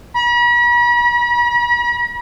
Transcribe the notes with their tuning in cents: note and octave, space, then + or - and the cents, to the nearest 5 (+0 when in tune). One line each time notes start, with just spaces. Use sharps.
B5 -45